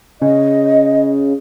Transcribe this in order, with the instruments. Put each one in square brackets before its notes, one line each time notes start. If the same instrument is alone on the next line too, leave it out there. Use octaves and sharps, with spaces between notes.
[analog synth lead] C#3 [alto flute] D#5